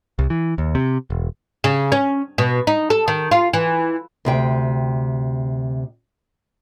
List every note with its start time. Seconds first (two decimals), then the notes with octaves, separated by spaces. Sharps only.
0.19 C2
0.30 E3
0.58 D#2
0.75 C3
1.10 E1
1.64 C#3
1.92 C#4
2.38 B2
2.67 D#4
2.90 A4
3.08 D#3
3.31 F4
3.53 E3
4.25 D2 C3 G5